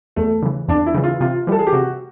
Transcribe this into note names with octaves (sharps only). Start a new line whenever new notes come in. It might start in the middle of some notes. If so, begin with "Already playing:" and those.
E2 A3
C#3 E3
E2 D4
E4
C#3 E3
F4
C3 F4
E3 G3 A4
G#4
G4
C3 F#4